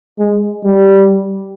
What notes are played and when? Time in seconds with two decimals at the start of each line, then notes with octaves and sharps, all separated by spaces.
0.19 G#3
0.64 G3